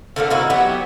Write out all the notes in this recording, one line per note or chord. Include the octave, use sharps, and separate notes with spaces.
D3 A3 A#3 D4
D#4 E4 F#4
F#3 B3 G4